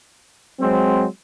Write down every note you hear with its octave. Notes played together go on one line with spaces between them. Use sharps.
F#3 G#3 C4